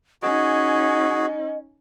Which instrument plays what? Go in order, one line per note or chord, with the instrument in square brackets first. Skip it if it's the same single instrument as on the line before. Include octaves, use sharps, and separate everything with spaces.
[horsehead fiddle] C#4 D#4 [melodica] F#4 G#4 [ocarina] D#5